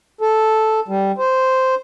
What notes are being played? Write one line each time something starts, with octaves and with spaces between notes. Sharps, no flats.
A4
G3
C5